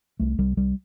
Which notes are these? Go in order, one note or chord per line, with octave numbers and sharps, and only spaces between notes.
C2 A3
C2 G3
C2 G3